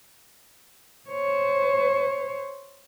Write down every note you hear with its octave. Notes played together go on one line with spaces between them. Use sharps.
C5 C#5